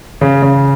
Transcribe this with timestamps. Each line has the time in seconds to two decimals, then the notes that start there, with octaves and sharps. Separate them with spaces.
0.21 C#3
0.42 C#3